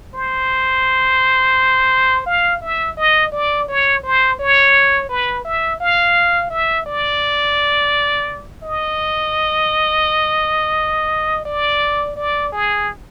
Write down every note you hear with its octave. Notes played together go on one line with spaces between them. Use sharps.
C5
F5
E5
D#5
D5
C#5
C5
C#5
B4
E5
F5
E5
D5
D#5
D5
D5
G#4